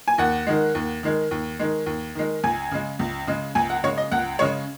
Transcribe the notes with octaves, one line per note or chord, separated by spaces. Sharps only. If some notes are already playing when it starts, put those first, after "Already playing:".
G#5
D#2 F#5
D#3 G#3
D#2
D#3 G#3
D#2
D#3 G#3
D#2
D#3 G#3
C#2 G#5
C#3 G#3
C#2
C#3 G#3
C#2 G#5
F#5
C#3 G#3 C#5
D#5
C#2 F#5
C#3 G#3 C#5